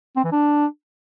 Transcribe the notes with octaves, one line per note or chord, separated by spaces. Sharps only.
C4
E3
D4